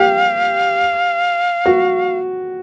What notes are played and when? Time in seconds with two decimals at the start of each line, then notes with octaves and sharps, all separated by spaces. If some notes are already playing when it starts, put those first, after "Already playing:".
Already playing: G4 F5
1.66 F#4